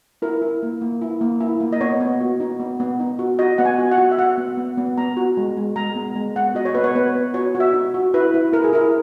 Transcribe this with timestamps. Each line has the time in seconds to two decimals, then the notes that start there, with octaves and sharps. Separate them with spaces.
0.22 E4 A#4
0.42 E4
0.63 A#3
0.81 A#3
1.02 E4
1.21 A#3
1.41 E4
1.60 A#3
1.73 D#5
1.80 B3 C#5
2.00 B3
2.20 F#4
2.40 D#4
2.60 B3
2.80 B3
3.00 D#4
3.19 F#4
3.39 F#4 D#5
3.58 B3 F#5
3.65 G#5
3.79 F#4
3.91 F#5
3.98 F#4
4.11 E5
4.18 F#4 F#5
4.38 B3
4.57 B3
4.78 B3
4.97 B3 A#5
5.17 F#4
5.37 G#3
5.57 G#3
5.76 G#3 A#5
5.95 B3
6.15 G#3
6.36 B3 F#5
6.55 F#4 D#5
6.65 C#5
6.75 B3 B4
6.84 C#5
6.95 B3 B4
7.15 B3
7.34 F#4 C#5
7.55 F#4
7.60 E5
7.73 D#4
7.94 F#4
8.14 E4 B4
8.34 E4
8.53 E4 A#4
8.64 G#4
8.73 E4 A#4